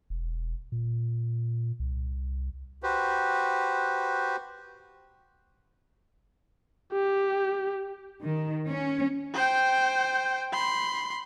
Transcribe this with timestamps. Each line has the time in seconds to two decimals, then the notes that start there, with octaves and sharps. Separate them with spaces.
0.10 E1
0.72 A#2
1.80 C2
2.83 F#4 G4 B4 C5
6.93 G4
8.23 D#3
8.69 C#4
9.34 C5 G5
10.53 B5 C6